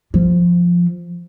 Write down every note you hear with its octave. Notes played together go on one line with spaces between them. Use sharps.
F3